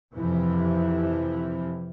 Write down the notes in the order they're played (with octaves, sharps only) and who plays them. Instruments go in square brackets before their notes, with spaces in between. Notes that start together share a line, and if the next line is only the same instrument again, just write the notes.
[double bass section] F2 C3 E3 F3